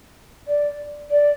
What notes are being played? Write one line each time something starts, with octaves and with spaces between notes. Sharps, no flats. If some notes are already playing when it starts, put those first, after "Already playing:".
D5
D5